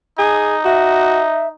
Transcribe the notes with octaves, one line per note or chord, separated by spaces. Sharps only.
D#4 G#4
F#4 E5